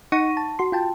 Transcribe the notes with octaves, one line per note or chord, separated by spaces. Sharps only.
D#4 F#5 C#6 A#6 D#7
A5
F#4 C6
F4 G5 A5